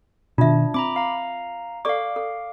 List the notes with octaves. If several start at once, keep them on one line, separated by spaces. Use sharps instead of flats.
B2 D#3 D4 F4 E5
C4 A#5 B5 D6
F5 A#5
A4 D5 F5 C#6 D6
A4